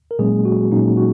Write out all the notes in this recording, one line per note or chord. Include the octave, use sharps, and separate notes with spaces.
A#4
A#2 F#3 G#3 A#3 C#4 G#4
F#4
A#2 F#3 A#3 C#4 D#4
F#4